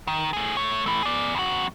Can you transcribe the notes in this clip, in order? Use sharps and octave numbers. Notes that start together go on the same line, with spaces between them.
D#3
A3 G#4
A3 C#5
E3 A3
G#4 D5
F2 F#4